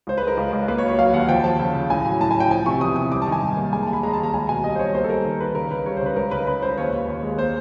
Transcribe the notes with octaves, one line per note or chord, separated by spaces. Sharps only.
C#2 C5
B4
G#3
A#4
C#2
C#2
A#3 B4
C#5
F#3
C#5
F#3 F5
D#2 F#5
F3 G5
F3 A5
C#3
C#3
A2 G#5
F#3
A2 A5
G#5
F#3 G5
F3 G#5
C3 C#6
E2 D#6
C3 D#6
G3 D6
A5
D#3
G#5
G2
A#3
G#3 G#5
A5
D#2
B5
G#3 A#5
A5
D#2
A#5
C#2 G#5
B2 G#5
G3 D#5
C5
G3 C#5
A#3 C5
A4
G3 A#4
D#3 A#4
D#3 B4
C#3 A#4
C#3 B4
G3 C#5
C5
C#3 B4
C#2 A#4
C#3 B4
C#3 B4
C#2 C5
D#2 C#5
B4
D#2
D#2
G#3
A#3 C5